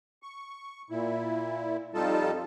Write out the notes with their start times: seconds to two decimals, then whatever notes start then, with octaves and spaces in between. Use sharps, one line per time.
0.23 C#6
0.90 A#2 E4
1.94 F2 G3 D#4 F4 A4 A5